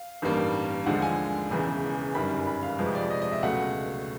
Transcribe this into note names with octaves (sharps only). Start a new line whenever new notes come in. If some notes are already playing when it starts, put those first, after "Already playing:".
Already playing: F5
A1 G2 D#3 G3 A#3
D#2 D3 F3 G#3 F#5
G#5
E1 E2 C#3 E3
G1 F#2 D#3 G3 B5
B5
F5
F2 C3 F3 G#3 B4
D5
D#5
D#5
E5
C#2 B2 F#3 A3 F#5